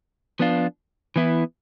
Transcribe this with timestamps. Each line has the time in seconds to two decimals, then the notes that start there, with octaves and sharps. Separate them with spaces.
0.39 F3 B3 D4 F4
1.16 E3 B3 E4